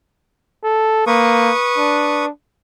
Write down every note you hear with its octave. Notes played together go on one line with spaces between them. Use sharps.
A4
A#3 B4 C#6 D#6
D4